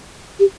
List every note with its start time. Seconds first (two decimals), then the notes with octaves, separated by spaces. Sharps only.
0.40 G4